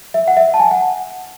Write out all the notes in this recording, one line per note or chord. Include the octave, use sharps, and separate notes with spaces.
E5
F#5
E5
A5
G#5
F#5